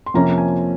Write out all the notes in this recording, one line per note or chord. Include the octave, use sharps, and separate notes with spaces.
C6
F2 C3 F3 A#3 C#4 A#5
G#5